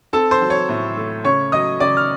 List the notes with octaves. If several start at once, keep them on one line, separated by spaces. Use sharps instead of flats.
C4 A4 A5
C5 C6
F#3
C#5 C#6
A2
A3
C#3 C#5 C#6
F#3 D#5 D#6
C#3 D5 D6
F6